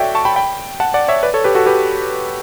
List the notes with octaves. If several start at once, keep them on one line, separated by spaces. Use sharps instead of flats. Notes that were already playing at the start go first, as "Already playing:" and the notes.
Already playing: F#4 A4 C#5 D5 E5 G5
A5 C#6
G5 B5
G5 B5
F#5 A5
D5 F#5
C#5 E5
B4 D5
A4 C#5
G4 B4
F#4 A4
G4 B4